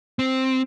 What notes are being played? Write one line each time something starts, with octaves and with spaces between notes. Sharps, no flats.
C4